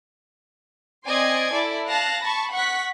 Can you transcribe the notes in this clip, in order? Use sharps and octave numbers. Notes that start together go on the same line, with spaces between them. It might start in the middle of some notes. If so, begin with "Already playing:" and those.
C4 D5 D#5 G#5 C6 G#6
E4 A4 D5
F5 A5 F#6 A#6
A5 B5 C#6
F#5 C#6 F#6 B6